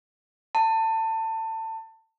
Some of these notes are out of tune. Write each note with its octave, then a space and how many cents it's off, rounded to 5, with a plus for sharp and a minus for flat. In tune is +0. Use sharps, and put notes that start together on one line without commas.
A5 +25